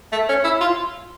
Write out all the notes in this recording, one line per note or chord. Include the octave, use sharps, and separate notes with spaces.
A3
C#4
E4
F4